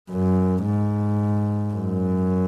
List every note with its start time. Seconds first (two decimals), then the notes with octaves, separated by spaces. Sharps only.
0.11 F#2
0.65 G#2
1.74 F#2